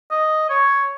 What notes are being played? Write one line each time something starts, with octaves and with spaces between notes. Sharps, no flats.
D#5
C#5